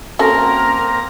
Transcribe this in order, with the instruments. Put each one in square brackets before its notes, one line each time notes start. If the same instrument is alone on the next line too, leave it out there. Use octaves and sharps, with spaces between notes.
[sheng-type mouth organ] A#3 C4 A#5 [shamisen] C#4 F#4 A4 [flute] A#4